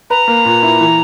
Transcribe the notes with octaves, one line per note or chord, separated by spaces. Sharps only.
B4 A#5
A#3
A#2
E4
E3